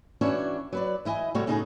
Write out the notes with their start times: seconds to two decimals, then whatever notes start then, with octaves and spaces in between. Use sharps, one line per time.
0.21 E3 C#4 D4 F#4 C#5
0.73 F#3 B4 D5
1.05 E3 E4 D#5 G#5
1.35 A2 C3 G3 A3 F#4 C#5
1.47 A2 C#3 D#4 F#4 G#4